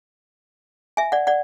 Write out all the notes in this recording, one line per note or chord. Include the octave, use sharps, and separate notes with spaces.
E5 G#5
D5 F#5
D5 F#5